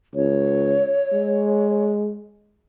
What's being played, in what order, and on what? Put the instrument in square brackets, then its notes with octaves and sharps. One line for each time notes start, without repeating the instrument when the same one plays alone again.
[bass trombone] C#2 [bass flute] C#5
[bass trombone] G#3